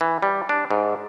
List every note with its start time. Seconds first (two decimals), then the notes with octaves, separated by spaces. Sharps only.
0.01 E3
0.22 G3
0.49 D4
0.71 G#2